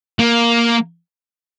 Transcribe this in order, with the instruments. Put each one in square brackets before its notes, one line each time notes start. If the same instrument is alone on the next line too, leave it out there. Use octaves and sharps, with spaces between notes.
[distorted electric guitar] A#3